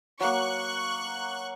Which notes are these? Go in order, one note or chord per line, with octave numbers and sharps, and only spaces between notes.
F#3 A#3 C#6 F#6